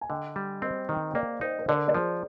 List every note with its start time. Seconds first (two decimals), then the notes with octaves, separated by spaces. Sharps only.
0.01 G#5
0.10 D3 D#5 G5
0.36 G3
0.62 C4 C5 D#5
0.88 D#3 D#5 G5
1.11 G5
1.15 A#3 D5 F5
1.41 D#4 C5 D#5
1.59 C5
1.68 D3 A#4 D5
1.88 D5
1.94 F3 G#4 C5